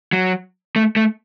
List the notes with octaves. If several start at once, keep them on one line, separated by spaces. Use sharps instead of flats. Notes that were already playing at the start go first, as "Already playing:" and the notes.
F#3
A3
A3